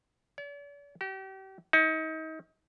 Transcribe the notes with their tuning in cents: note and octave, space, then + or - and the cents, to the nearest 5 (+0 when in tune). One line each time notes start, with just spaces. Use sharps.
D5 -45
G4 -35
D#4 +35